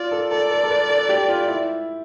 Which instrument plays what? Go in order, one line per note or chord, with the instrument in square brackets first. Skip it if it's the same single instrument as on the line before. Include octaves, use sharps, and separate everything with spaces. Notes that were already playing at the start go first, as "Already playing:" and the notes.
Already playing: [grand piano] F4 [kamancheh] D5
[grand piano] A4
[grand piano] A4 [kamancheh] D5
[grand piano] A4
A4
B4
A4
G4
F4
E4